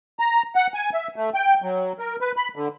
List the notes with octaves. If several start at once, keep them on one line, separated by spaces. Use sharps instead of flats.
A#5
F#5
G#5
E5
A3
G5
F#3
A#4
B4
B5
D3